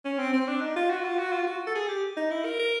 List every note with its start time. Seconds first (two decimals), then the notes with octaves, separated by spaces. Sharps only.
0.05 C#4
0.19 C4
0.33 C4
0.48 D4
0.61 D#4
0.76 F4
0.90 F#4
1.05 F4
1.19 F#4
1.33 F4
1.47 F#4
1.67 A4
1.75 G#4
1.88 G4
2.17 D#4
2.31 E4
2.45 A#4
2.60 A#4